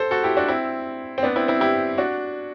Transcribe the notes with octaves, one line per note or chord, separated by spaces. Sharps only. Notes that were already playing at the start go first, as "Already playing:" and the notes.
Already playing: A4 C5
F#4 A4
E4 G4
D4 F#4
C4 E4
C4
B3 D4
C4 E4
C4 E4
E4 G4
D4 F#4